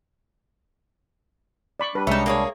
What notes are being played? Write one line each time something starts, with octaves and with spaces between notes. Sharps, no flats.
D5 B5 C#6
G3 D4 B4
C2 G#3 C#4 D#4 E5 A5
A#3 G#4 C#5